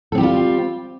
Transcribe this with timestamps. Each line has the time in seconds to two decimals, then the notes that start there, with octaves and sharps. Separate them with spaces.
0.12 A4
0.15 C4
0.18 G4
0.20 G3
0.23 F4